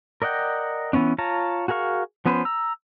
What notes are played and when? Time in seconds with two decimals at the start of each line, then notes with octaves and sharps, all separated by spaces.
0.22 A#4 D5 D#5 F#5 G5
0.93 E3 B3 C#4 D4
1.18 F4 C#5 A5 A#5
1.68 F#4 G#4 A#4 F5 C#6
2.26 F3 B3 C#4 B4 C5
2.45 A#5 E6